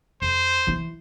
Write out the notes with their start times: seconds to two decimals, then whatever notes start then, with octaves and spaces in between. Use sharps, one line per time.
0.22 F2 C5
0.67 E3 E4